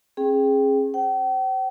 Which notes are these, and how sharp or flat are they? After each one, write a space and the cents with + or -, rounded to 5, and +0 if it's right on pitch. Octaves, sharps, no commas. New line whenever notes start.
C#4 -45 G#4 +0 G5 +0
C5 +0 G5 -45